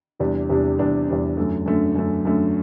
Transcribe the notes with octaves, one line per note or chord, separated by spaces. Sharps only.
E2 C3 G3 D4
E2 C3 G3 D4
E2 C3 G3 D4
E2 C3 G3 D4
F#2 D3 A3
F#2 D3 A3
F#2 D3 A3
F#2 D3 A3